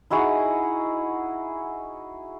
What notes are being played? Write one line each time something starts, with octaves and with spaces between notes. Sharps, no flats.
D#4 E4 F#4 G#4